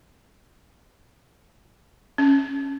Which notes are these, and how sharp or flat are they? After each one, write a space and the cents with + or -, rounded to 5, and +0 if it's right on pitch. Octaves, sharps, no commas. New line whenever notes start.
C#4 -10